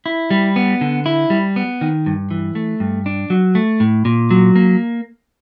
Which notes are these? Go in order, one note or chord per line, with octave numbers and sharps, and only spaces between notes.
E4
G3
B3
D3
E4
G3
B3
D#3
G2
E3
A3
G2
D4
F#3
A3
A2
A#2
F#3
A#3